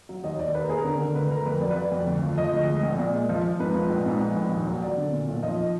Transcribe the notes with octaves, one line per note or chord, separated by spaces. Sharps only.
F#3
D#2 D#5
D#2 D5
D#2 B4
A#4
D#2 G#4
A#4
D3
D3
D2 B4
D2 A#4
F2 B4
F#3 D5
B4
F#3 D5
F2
D2
F3
F3 D#5
D2
G#3
A#1
A#2 D5
G#3
F3
F3
G#2 B4
F3
A#1
G#2
A#1
A#1
D#2
F#3
F#3 D5
D3
A#2
B1
F3 D#5